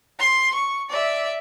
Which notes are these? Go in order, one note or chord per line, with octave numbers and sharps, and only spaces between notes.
C6
C#6
D5 E5